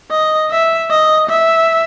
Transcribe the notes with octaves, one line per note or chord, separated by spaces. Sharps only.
D#5
E5
D#5
E5